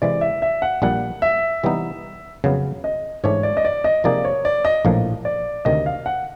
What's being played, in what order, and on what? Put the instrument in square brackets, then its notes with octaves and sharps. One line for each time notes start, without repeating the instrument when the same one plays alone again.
[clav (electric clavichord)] C3 E3 G#3 [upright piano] D5
[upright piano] E5
E5
F#5
[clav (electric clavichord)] A#1 A#2 G3 [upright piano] F#5
[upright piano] E5
[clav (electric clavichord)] C3 E3 G3 B3 D#4
F2 C#3 F#3 B3
[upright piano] D#5
[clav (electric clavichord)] G#2 E3 A3 D4 [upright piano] C#5
[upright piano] D5
D#5
D5
D#5
[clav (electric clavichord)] C3 F3 A#3 D#4 G#4 [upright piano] D5
[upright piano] C#5
D5
D#5
[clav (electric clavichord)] A#1 A2 F3 A#3
[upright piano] D5
[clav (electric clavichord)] D2 C3 D#3 [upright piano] D#5
[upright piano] F5
F#5